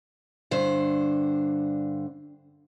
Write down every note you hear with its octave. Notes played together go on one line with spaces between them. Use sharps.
G2 D3 C5